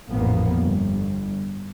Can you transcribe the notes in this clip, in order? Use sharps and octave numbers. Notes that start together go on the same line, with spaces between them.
A1 F2 A#2 F3 A#3 B3
G1